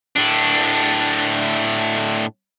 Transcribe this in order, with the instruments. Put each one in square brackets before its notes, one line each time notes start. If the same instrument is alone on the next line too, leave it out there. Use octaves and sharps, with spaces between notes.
[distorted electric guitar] A2 D4